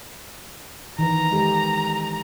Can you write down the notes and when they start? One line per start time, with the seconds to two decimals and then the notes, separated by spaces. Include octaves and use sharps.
0.99 D#3 E3 B4 A#5
1.31 G#3 G4 A4